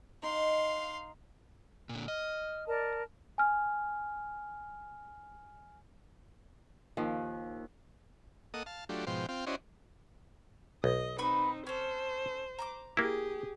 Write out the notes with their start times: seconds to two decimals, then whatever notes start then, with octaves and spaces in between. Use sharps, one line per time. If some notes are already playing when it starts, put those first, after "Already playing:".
0.23 D#4 F5 C6
1.89 A#2 D3
2.08 D#5 F6
2.66 A#4 D5 A5
3.38 G#5 F6
6.97 D#2 D#3 F3
8.54 A#3 A4 D#5 F#5 D#6
8.66 F5 A5
8.89 F#3 A3 D4 F4 G4
9.07 G#2 B2 F3 C5 F5 G5
9.29 C4 F4 F5 G5
9.47 C#4 E4 F#4 C5 D5 D#5
10.84 B1 D#5
11.18 C4 D#4 B4 B5 C#6
11.67 C#4 A4 C5
12.59 A#5 C6 D6
12.97 A#3 E4 G4 G#4